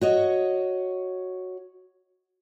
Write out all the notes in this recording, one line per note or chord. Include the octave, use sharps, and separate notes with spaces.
F#4 C#5 D#5